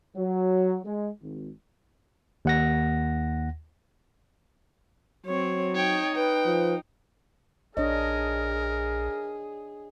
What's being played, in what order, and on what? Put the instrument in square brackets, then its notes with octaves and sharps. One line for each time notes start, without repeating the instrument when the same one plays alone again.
[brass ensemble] F#3
G#3
G#1
[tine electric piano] D#2 F#5 A#6
[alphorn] F#3 [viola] C4 C#5
[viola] D#4 [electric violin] C#5 G5
[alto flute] B4 [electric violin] G5
[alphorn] F3
[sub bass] A#1 [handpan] D4 C#5 D#5 [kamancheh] G#4 [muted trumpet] A#4